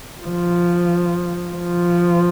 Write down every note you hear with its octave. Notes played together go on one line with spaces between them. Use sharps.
F3
F3